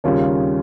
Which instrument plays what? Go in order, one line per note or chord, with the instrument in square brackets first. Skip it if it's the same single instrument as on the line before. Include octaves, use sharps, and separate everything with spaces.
[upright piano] D#2 C#3 G3 C#4 F4